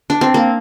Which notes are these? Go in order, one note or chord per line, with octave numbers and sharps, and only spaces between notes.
D4
C4
A#3